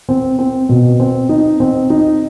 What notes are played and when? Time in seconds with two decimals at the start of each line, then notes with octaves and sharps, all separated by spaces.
0.09 C4
0.39 C4
0.69 B2
1.00 C4
1.29 D#4
1.60 C4
1.90 D#4